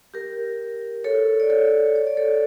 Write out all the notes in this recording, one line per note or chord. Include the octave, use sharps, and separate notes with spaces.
G4 A#4
A4 C#5
D5
A4 C#5
C#5
D5
A4 C#5